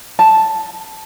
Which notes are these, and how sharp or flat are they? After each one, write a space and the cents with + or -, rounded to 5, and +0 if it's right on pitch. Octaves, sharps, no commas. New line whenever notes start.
A5 +0